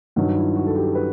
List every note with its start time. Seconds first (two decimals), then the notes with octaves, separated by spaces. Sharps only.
0.16 G2 D#3 F#3 D#4
0.36 E4
0.56 F#4
0.67 A4
0.76 G4
0.95 B4